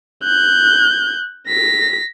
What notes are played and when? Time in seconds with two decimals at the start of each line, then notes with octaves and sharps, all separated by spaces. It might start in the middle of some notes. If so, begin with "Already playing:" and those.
0.24 F#6 G6
1.48 A#6 B6